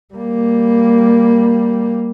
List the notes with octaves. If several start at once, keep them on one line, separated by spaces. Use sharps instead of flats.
G3 A#3